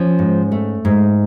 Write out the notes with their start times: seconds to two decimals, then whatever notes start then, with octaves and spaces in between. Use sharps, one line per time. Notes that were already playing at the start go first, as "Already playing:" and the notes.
Already playing: F3 C#4
0.19 G#2
0.52 A3
0.85 G#2